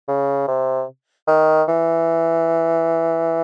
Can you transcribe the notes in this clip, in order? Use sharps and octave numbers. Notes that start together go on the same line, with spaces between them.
C#3
C3
D#3
E3